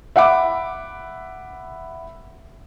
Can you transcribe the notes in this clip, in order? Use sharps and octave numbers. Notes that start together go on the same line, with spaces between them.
E5 F#5 B5 D6